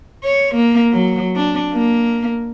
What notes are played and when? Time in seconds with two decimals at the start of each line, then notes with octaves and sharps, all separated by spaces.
0.24 C#5
0.55 A#3
0.92 F#3
1.36 D4
1.74 A#3